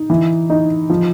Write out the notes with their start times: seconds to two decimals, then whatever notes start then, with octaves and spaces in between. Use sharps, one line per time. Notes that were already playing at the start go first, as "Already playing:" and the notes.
Already playing: D#4
0.10 E3
0.50 D#4
0.90 F3